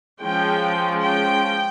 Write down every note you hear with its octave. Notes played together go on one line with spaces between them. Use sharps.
F3 G#3 C#4 G5
G5